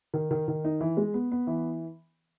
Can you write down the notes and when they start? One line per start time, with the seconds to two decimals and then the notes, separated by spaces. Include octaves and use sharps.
0.14 D#3
0.31 D#3
0.48 D#3
0.64 D#4
0.81 E3
0.97 G#3
1.14 B3
1.32 B3
1.47 E3